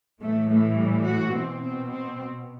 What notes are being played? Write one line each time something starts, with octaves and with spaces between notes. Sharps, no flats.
A2 E3 A3
A3
G3
F#4
B2 C4
C4
C4